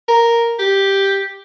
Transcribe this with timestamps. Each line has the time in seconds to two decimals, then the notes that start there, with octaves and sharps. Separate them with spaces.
0.08 A#4
0.59 G4